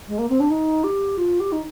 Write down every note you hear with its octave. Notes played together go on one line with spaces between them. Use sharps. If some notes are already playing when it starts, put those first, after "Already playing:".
G#3
A#3
C4
D4
D#4
G4
F4
G4
D#4